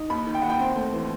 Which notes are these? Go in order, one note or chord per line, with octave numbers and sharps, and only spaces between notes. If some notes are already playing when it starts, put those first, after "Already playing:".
Already playing: D#4
D#2 B5
D#3
G5
D#2 F#5
G5
C4 C5
A3
E3